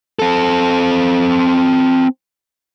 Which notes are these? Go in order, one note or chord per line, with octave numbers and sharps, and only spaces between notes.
C4 A4